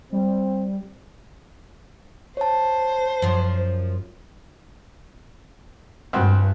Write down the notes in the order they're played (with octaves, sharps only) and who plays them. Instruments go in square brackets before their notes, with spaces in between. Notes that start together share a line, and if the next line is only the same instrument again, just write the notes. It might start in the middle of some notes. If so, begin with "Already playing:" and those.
[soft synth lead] G3 [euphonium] C4
[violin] C5 [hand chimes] C#5 A5
[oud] F#2 F3
[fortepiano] C#2 C4 F#4 [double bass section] G2